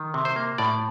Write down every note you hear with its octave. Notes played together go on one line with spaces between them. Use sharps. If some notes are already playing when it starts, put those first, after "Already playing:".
Already playing: D#3
C3
C5
A#3
A2 D5